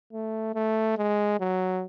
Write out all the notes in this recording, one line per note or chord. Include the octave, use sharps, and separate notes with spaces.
A3
A3
G#3
F#3